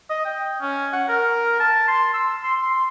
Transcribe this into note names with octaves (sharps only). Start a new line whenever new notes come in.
D#5
G5
C#4
F#5
A#4
A5
C6
E6
C6
C6